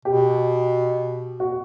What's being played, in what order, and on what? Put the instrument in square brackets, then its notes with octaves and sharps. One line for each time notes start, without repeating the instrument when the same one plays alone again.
[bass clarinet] B2 [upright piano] G4
[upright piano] F#4